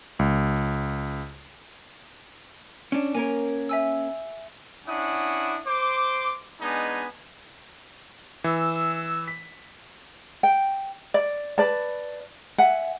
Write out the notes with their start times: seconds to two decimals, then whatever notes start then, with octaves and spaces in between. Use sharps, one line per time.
0.19 C#2
2.92 C#4 D4
3.15 A#3 C#4 A#4 G#5
3.69 E5 G#5 E6
4.87 C#4 D4 E4 F#5 D#6
5.66 C5 C6 D6
6.61 G#3 B3 D4 D#4 G#5
8.44 E3 E6
9.28 B6
10.43 G5
11.14 D5
11.58 B4 D5 A5
12.58 E5 F#5 G#5